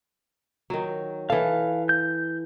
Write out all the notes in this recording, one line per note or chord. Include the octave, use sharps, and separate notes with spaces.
D#3 F#3
E3 A4 F5
G6